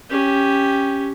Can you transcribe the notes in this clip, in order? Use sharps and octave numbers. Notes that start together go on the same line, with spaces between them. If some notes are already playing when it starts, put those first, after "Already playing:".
C#4 G4